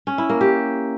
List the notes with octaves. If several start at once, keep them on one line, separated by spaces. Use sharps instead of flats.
C#4
E4
A#3
G4